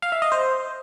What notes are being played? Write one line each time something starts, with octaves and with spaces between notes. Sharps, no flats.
F5
E5
D#5
C5